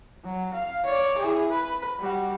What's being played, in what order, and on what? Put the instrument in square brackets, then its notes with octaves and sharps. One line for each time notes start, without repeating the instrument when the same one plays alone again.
[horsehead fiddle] F#3
F5
C#5 D5
E4 G#4
B4
G3 F#4